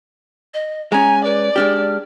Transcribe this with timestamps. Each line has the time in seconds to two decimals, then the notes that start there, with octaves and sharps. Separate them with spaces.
0.54 D#5
0.92 G#3 C#4 G#5 A#5
1.24 B4 D5
1.56 G#3 D4 G4 F6